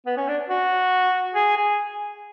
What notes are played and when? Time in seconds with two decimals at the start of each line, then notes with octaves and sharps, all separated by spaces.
0.06 B3
0.17 C#4
0.28 D4
0.50 F#4
1.35 G#4
1.57 G#4